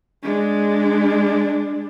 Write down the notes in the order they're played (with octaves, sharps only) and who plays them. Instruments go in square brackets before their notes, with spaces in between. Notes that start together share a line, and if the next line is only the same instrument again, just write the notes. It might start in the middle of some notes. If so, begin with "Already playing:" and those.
[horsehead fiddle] G#3 D4